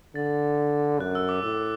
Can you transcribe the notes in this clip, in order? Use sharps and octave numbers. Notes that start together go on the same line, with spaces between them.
D3 A6
F#2 F#6
E6
D6
A2 E6